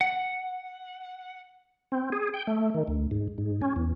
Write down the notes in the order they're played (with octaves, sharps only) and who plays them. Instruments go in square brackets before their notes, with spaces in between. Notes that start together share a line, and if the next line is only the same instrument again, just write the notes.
[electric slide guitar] F#5
[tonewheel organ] C4
G#4
G5
A3
D#3
D2
G#2
G#2
C#4
E2